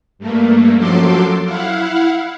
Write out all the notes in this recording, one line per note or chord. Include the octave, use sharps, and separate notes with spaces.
G2 A3 A#3
F#2 F3 F#3 A4 C6 D6
E4 F5 F#5